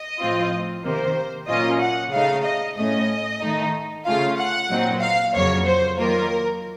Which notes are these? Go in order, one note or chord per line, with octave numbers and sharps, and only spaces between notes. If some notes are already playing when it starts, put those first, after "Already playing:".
Already playing: D#5
A2 F3 C4 F4
C3 D#3 A#3 C5
A#2 F#3 A#3 C#4 F4 D#5
F#5
C#3 A3 D#4 F5
D#5
A2 A3 C#4 D#5
D#3 A3 D#4
C#3 A3 C#4 F4 F5
F#5
A#2 F#3 C4 D#4
F5
F2 C#3 F#3 A#3 C#5
C5
D#3 F#3 A#3 F4 A#4